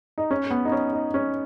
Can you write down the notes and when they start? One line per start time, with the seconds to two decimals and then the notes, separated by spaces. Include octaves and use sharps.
0.18 D#4
0.31 C#4
0.51 B3
0.65 D#4
0.72 C#4
0.93 D#4
1.14 C#4